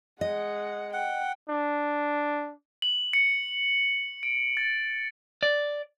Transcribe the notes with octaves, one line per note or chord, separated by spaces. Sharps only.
G#3 D#5 F#5
F#5 G5
D4
F#7
C#7
D7
A6
D5